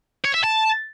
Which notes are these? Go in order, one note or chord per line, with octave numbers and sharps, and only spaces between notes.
C#5
E5
A5